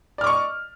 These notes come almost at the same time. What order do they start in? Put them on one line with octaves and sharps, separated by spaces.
D5 F6 D6 C#6 D#5